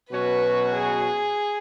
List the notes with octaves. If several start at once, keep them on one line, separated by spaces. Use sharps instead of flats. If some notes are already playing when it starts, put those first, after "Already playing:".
B2 F#3 C#4 F#4 B4
G#4